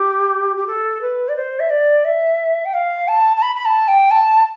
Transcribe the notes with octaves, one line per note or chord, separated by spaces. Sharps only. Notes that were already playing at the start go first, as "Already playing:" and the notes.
Already playing: G4
G4
A4
B4
D5
C5
E5
D5
E5
G5
F5
A5
A5
B5
B5
A5
G5
A5